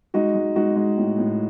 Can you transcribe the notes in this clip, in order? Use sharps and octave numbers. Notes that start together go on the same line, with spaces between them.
G#3 D#4 F#4
G#3
G#3 D#4 F#4
G#3
A2
A2